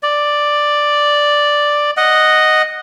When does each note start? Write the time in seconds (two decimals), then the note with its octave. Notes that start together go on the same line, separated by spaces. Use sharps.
0.03 D5
1.97 D#5 F#5